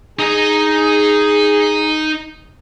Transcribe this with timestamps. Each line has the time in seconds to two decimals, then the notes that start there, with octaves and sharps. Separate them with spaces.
0.19 D#4 G#4 D#5